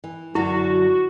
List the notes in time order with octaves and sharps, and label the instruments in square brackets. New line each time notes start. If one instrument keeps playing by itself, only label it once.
[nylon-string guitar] E3
[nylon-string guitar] F#2 D3 F#3 [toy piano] E4 [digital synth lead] F#4